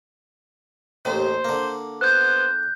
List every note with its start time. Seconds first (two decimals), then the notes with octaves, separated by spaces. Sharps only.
1.05 A1 D#2 D#3 C5
1.45 D3 A#3
2.01 B3 C5 F#6 G6